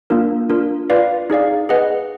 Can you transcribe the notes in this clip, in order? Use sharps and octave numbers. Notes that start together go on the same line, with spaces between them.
A#3 D4 F4 A#4
D4 F4 A#4
F4 B4 D5 F5
D#4 G#4 D5 F5
G#4 B4 D#5 F#5